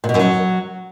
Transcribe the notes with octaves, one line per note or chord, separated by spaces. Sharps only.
A#2
B2
F#2
F#3